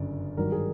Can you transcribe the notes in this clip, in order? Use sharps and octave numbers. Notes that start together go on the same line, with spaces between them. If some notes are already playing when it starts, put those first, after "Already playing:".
Already playing: G1 F#2 C#3 D5
G#1 G2 D#3 F#3 A#4
G#4